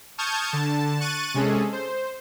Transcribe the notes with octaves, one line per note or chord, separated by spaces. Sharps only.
A5 C#6 D#6 F6 G6 G#6
D3 A5
C#6 F#6 A6 D#7
C3 G#3 C#4 G#4 A4
C5